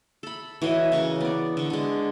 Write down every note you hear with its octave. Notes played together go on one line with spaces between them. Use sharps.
A4 B5
E3 F#4 C#5 D#5
C#3 A#4 C#6
B3 D5
D3 C#6
D3 G#3